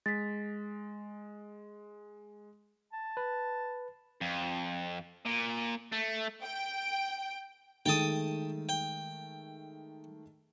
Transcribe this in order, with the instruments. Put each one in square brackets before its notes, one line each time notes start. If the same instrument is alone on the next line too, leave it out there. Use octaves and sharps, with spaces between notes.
[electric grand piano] G#3 [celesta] A6 B6
[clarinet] A5
[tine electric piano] B4
[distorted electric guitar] F2
A#2
A3
[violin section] G5
[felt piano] D#3 G#3 A3 [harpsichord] G5 A5 D#6
[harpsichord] G5